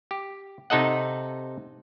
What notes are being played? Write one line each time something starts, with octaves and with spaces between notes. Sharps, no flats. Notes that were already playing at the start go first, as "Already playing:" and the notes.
G4
C3 D#4 A4 D#5 F#5